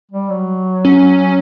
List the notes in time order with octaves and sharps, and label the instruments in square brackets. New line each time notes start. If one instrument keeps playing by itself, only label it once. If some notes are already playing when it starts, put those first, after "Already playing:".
[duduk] G3
F#3
[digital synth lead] C#4